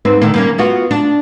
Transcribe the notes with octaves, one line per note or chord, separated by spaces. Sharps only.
G#2 C4 B4
D3 D#3 A#3
G3 A#3 C#4
B3 F4 F#4
D4